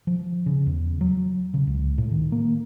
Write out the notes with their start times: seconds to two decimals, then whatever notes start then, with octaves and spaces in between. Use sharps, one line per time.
0.07 F3
0.46 C#3
0.66 E2
1.01 F#3
1.54 C#3
1.67 C#2
1.98 A2
2.11 D#3
2.32 A#3